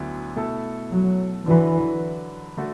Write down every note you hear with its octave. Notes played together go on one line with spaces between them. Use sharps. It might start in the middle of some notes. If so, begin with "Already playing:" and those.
Already playing: D2 D3 F#3 B3 E4
B2 A3 E4 A4
F#3
D3 E3 F#3 D4 F#4 B4
D3 A3 F#4